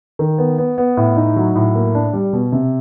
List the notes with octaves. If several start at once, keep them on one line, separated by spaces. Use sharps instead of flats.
D#3
B3
B3
B3
A2
D#4
F#3
A2
A#3
D4
G3
B2
C3